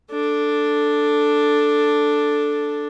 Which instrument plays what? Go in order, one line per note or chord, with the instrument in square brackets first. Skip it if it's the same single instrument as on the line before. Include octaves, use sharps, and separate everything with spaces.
[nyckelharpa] D4 A4